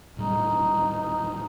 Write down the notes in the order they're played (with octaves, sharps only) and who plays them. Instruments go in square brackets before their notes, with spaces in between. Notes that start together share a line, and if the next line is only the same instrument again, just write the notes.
[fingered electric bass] D#1 A2 G3 [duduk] D#4